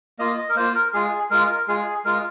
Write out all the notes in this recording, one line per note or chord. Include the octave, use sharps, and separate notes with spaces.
A#3 F4 D#5
D#5
A#4
A#3 F4 C5
A#4
G#3 F4 G#4
G#3 F4 A#4
A#4
G#3 F4 G#4
G#3 F4 A#4